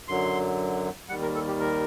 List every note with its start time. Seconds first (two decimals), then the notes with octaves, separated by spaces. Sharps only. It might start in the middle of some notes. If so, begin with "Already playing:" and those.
0.08 F#2 D3 F#3 C6
1.09 D#2 D#3 G3 F#5
1.22 A#4
1.35 A4
1.47 G4
1.60 A#4